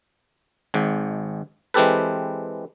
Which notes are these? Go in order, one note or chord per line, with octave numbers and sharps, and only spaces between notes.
G#1 G#2
E3 G#3 C4 G4 A4 B4